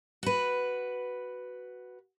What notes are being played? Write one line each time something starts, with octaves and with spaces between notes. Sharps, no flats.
F#4 B4